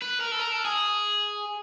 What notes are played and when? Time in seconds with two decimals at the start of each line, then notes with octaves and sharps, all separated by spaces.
0.02 B4
0.21 A#4
0.32 A4
0.39 A#4
0.52 A4
0.65 G#4